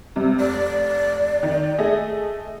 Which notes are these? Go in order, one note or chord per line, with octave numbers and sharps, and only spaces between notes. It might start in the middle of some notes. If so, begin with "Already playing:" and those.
G2 C3
F1 D5
D#3 D#4
A3 G#4 D#5